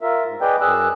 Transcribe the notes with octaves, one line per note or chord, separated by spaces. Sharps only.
F4 A#4 E5
G#2
G#4 B4 D5 D#5 G5
F#2 G#4 E6 F#6